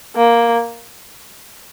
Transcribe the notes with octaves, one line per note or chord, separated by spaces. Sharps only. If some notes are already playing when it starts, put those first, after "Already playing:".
A#3